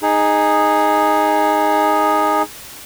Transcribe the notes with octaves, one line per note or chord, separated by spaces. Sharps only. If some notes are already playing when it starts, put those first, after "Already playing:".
D#4 G#4